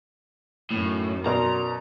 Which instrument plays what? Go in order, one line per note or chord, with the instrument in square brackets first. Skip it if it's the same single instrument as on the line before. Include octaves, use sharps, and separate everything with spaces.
[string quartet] F#2 D#3 [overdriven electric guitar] A2
[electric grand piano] B2 [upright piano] A#4 D5 C6 [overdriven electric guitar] A#5